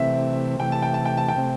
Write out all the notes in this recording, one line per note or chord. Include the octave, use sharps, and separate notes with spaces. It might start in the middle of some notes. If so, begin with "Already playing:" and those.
Already playing: C3 E3 A3 C4 E5
C3 E3 A3 G5
A5
G5
A5
G5
A5
G5
C3 A3 C4